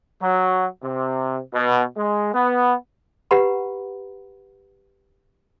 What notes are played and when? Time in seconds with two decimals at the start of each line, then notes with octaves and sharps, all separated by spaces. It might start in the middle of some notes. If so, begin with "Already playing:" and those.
0.21 F#3
0.82 C3
1.53 B2
1.96 G#3
2.33 B3
3.31 G4 B4 F#5 A#5 B5